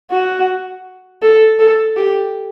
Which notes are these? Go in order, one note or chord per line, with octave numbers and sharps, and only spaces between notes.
F#4
A4
A4
G4